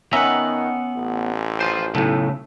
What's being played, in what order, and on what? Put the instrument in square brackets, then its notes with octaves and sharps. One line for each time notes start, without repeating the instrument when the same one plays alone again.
[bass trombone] D#3 [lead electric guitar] B3 F#5 [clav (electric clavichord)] C#4 E5 A#5
[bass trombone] A1
[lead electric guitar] F4 C5
[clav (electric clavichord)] B1 A2 [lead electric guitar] C#3 A3